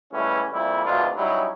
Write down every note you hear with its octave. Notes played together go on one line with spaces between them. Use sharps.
C#2 A2 E3 G3 C#4
F2 A#2 G3 E4
G#1 D2 B2 D4 F4
F#3 G3 C#4 D#4 E4